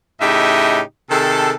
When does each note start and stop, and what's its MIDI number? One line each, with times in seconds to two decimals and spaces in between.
0.21 0.80 45
0.21 0.80 49
0.21 0.80 63
0.21 0.80 67
0.21 0.80 75
0.21 0.80 76
1.10 1.53 48
1.10 1.53 51
1.10 1.53 68
1.10 1.53 69